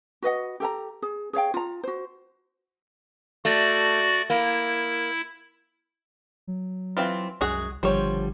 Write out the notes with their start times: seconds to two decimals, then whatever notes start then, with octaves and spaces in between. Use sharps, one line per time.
0.22 F#4 B4 D#5 F#5
0.60 G4 A4 G5 A#5
1.02 G#4
1.33 G#4 C#5 F5 G5
1.54 F4 A#5
1.83 F#4 C5
3.45 A3 F#4 D5
4.30 A#3 E4
6.47 F#3
6.97 E3 C4 F4
7.41 C2 F#2 G#3 F#4 G#4
7.83 G#1 D3 F3 G3 C5 C#5